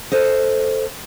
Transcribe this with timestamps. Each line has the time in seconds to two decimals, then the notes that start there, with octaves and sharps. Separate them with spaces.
0.12 A4 C5 D#5